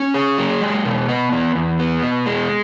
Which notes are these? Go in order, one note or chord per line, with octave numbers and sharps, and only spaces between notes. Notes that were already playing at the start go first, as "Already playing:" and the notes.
Already playing: C#4
G#4
F#3
G#3
B2
B3
E2
E2
B3
B2
G#3